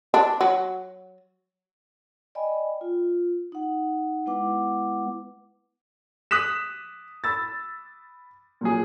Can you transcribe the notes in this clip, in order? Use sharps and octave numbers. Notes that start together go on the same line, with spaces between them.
D4
F#3
D5 D#5 G5 G#5 B5
F4
D#4 F#5
G#3 B3 E4 B4 F#5 D6
D#6 F#6 B6 E7
B5 E6 A6
A#2 F#3 G#4